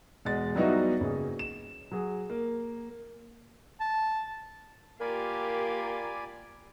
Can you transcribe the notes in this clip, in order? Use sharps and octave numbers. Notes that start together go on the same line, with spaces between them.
E2 B2 G#3 A6
F#3 G3 B3 D#4 E4 F#4
F#1 G#4
E7
F#3 G#4
A#3
A5
A#3 F4 G4 A#4 D5 G#5 B5